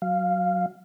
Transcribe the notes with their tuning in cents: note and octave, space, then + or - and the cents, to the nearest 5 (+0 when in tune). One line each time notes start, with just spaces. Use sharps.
F#3 +0 F5 +0